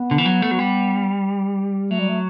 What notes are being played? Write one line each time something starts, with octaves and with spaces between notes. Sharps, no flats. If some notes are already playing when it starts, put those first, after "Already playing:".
Already playing: B3
D3
E3
F#3
A3
F#3
G3
F#3 A3
G3
A3